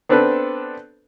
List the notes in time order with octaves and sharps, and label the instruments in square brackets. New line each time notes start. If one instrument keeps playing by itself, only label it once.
[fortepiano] B3 C4 D4 A4 B4